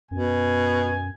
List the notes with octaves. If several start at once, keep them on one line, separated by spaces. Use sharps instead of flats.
F#2 B2 G#5